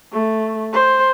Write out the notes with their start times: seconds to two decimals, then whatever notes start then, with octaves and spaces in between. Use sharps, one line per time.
0.12 A3
0.73 C5